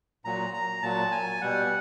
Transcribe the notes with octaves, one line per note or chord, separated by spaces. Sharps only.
A#2 F#3 A#5
A#5
A#2 F#3 A5
G#5
B2 G3 F#5